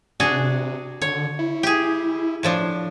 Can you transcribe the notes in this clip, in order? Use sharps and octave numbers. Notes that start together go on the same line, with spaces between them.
C3 D4 F#4 G#4
D3 C#5
E4
G4 G#4
A2 F3 D4